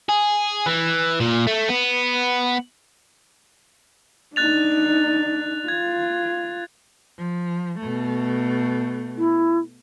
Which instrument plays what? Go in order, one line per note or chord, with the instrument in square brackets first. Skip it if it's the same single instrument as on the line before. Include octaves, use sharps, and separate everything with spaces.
[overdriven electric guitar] G#4
E3
A#2
A3
B3
[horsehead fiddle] D4 D#4 [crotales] F#6 A6 F7
[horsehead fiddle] F4 [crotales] G#6
[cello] F3
B2 A3
[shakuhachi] E4